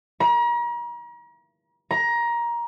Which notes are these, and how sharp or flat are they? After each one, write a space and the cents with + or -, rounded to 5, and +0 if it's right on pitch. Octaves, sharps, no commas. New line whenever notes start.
A#5 +40
A#5 +20